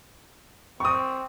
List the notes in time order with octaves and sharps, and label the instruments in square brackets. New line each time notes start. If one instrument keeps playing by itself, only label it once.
[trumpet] C4 [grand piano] C#6 D#6